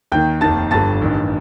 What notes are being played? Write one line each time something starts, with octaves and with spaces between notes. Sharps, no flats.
D#2 D#3 G5 G6
F1 D#2 D#3 A5 A6
G1 G2 D3 A5 A6
A1 G2 D#3